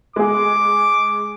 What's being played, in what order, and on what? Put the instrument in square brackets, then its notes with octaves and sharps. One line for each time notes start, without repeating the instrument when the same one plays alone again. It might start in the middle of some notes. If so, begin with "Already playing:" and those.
[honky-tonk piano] G#3 G#4 [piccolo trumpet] D6